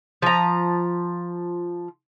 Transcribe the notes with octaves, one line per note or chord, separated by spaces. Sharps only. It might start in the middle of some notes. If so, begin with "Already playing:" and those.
F3 A#5